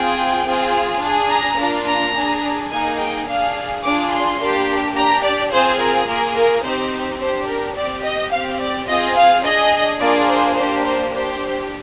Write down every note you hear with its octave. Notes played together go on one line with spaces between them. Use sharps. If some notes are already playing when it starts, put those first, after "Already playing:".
Already playing: C4 F4 G#4 G5
C4 F4 G#4
D4 G#4
A#5
A#3 D4 F4
A#5
D4 G#4
A#3 D#4 G#4 G#5
G5
D4 G#4 F5
D4 F4 G#4 D6
C6
A#3 D4 G4
D4 G4 A#5
D5
C4 F4 G#4 C5
A#4
A#3 F4 G#4 A#4
A#4
C4 D#4 G4 C5
D4 G4 C5
A#4
C4 G4 D5
D#5
C4 G4 F5
D5
C4 F4 G#4 D#5
F5
D4 G#4 D#5
A#3 D4 F4 G#4 D5
C5
A#3 D4 G4 C5
C5
D4 G4 C5